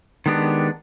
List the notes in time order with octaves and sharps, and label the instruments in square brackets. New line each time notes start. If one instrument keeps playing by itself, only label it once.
[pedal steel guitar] D#3 G#3 B3 D4 G4